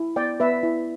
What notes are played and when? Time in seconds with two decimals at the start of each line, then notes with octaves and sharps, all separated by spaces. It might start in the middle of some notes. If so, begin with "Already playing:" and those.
Already playing: E4
0.16 B3 D5 G5
0.40 B3 B4 E5
0.63 E4